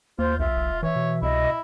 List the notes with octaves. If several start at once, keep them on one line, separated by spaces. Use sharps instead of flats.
D#2 A#3 F4 C5
B1 F4 E5
E1
E3 C#5 E5
B2
C2 E4 D#5